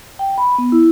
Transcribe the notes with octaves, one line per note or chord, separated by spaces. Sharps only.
G5
B5
B3
E4